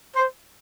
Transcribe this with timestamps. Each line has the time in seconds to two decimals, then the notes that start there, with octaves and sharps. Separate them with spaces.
0.16 C5